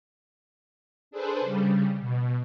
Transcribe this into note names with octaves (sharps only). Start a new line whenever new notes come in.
D4 G#4 A4 B4 C5
C#3 G3
B2